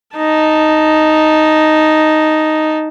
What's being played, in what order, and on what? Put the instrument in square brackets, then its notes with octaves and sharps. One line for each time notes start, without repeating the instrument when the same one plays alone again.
[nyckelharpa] D#4 A5